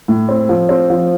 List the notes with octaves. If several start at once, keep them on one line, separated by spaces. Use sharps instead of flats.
A2
C4
F3
C4
F3